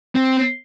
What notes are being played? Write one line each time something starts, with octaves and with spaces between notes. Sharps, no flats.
C4